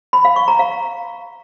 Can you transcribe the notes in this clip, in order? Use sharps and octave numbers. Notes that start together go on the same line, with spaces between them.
B5
F5
C#6
A#5
F5